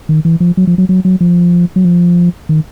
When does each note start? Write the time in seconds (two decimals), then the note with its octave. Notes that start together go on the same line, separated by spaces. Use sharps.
0.09 D#3
0.25 E3
0.40 F3
0.57 F#3
0.67 F3
0.78 F#3
0.89 F#3
1.05 F#3
1.21 F3
1.76 F#3
1.84 F3
2.49 D#3